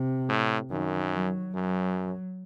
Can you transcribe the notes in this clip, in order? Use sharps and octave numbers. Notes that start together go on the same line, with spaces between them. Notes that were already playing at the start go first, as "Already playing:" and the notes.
Already playing: C3
A2
F#2 D#3
F#3
F#2 F#3